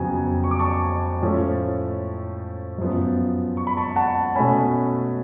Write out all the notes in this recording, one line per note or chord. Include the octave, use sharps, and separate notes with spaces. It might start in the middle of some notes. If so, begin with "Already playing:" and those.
Already playing: F2 C#3 F#3 B3 G#5
C#6
D6
A5 C#6
A2 F3 A3 C#4
F#2 F3 B3
C#6
B5
A5 C#6
F#5 A5
B2 A3 C#4 G#5 B5